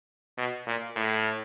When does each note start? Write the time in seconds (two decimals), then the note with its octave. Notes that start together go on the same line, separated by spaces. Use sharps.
0.38 B2
0.67 A#2
0.96 A2